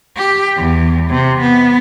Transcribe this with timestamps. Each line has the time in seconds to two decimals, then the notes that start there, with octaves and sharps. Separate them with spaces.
0.16 G4
0.56 E2
1.10 C3
1.41 B3